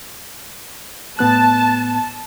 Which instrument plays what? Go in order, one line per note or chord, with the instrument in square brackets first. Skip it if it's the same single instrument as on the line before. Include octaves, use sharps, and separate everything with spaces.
[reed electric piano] A2 B3 F#6 [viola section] A5